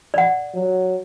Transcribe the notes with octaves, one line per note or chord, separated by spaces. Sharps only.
D5 F#5
F#3